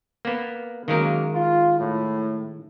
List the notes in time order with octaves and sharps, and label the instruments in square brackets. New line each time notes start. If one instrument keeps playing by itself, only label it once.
[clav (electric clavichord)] A#3 B3
[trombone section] F#2 A#3 [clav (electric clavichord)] D#3 G#3 A#4
[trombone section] F4
A2